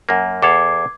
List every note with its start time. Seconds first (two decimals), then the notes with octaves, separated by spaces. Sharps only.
0.09 F#2 A#3
0.42 E2 A4 F5 D6 G#6 C7